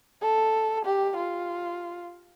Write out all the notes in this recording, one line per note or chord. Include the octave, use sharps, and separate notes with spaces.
A4
G4
F4